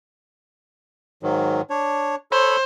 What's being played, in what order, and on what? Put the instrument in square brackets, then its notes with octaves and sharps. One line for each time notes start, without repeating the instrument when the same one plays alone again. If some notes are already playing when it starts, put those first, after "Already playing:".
[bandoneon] G#2 D#3 F#3
D4 C#5
[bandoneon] A4 C#5 B5 [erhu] C5